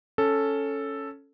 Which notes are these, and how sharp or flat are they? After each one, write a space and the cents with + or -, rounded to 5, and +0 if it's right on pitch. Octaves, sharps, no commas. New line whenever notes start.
C#4 +0 A4 +0